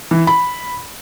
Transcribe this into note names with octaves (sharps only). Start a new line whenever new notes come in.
E3
B5